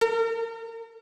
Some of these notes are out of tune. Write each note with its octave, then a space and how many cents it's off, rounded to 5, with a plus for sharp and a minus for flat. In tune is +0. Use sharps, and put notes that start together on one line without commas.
A#4 -35